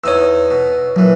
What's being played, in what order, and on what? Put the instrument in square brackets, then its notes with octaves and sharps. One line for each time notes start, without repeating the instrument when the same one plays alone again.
[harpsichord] E2 D#4 D#6 [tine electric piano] C#5 E6
[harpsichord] B2
[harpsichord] A#1 E3 [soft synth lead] F#3